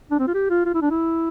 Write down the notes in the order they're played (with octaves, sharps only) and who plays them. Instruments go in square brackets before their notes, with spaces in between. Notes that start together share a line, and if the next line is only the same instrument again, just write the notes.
[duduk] D4
C4
F4
G4
F4
F4
E4
D4
E4